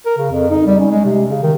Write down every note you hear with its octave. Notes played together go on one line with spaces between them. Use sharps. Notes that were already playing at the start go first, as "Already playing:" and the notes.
A#4
C#3
F2
D#4
G3
C#4
G#3
C3
C#3
D#3